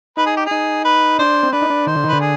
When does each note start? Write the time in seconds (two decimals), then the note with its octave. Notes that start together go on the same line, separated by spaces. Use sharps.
0.17 D#4 B4
0.26 G#4
0.37 G4
0.46 G#4
0.51 D#4
0.85 B4
1.19 D4 C5
1.43 C4
1.52 D4 B4
1.62 D#4
1.70 D4
1.87 D#3 C5
1.96 D3
2.04 D#3
2.09 D3 B4
2.20 G#4